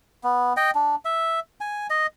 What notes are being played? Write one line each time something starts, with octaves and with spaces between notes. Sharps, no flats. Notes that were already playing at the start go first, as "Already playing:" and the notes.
B3
D#5 G5
D4
E5
G#5
D#5